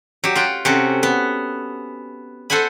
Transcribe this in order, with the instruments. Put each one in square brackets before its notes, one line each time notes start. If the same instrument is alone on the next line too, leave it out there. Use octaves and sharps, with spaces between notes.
[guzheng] F#3 G4
F4 F#5 G5
C3 C#4 F#4 A4
B3
A4 C5 F#5 G#5 B5